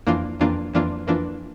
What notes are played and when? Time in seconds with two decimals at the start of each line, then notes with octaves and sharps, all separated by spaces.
0.07 F2 E3 A#3 D4 F4
0.40 F2 E3 A#3 D4 F4
0.73 F2 E3 A#3 D4 F4
1.07 F2 E3 A#3 D4 F4